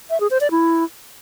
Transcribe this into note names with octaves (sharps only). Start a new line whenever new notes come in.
E5
G#4
C5
D5
E4